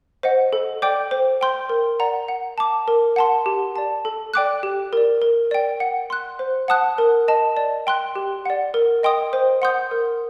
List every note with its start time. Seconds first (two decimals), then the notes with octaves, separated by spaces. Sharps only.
0.23 C5 D#5 F#5
0.53 A4
0.82 D5 G5 D6 G6
1.11 C5
1.41 G5 C6 G6
1.69 A#4
2.00 D5 F#5 A#5
2.28 F#5
2.58 A5 D6
2.88 A#4
3.16 F#5 A5 C6
3.46 G4
3.76 D5 A5
4.05 A4
4.34 D5 G5 D6 F#6
4.63 G4
4.93 A#4 D5
5.22 A#4
5.51 D5 G5
5.80 F#5
6.10 C6 F#6
6.39 C5
6.68 F#5 A5 D#6 F#6
6.98 A#4
7.28 D#5 A5
7.57 D5
7.87 G5 C6 F#6
8.16 G4
8.45 D5 F#5
8.74 A#4
9.03 D#5 G5 C6 D#6
9.33 C5
9.62 F#5 C6 D#6 G6
9.91 A#4